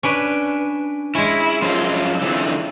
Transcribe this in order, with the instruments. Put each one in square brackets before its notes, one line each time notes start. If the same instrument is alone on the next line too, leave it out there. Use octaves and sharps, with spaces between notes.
[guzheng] C#4 D4 B4
[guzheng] G#3 C#4 [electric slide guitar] E4
[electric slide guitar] F#2 F3 C5 [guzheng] F4
[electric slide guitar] D3 E3 C4